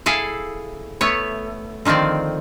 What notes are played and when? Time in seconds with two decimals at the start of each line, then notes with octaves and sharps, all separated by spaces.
0.06 E4 G#4 A4 F5
1.01 A3 B3 C#5
1.85 D3 D#3 F3 C4 D5